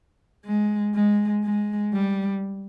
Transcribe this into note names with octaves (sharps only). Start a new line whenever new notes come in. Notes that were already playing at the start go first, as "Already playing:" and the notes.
G#3
G#3
G#3
G3